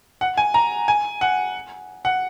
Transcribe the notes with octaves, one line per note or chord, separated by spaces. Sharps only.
F#5
G#5
A#5
G#5
F#5
F#5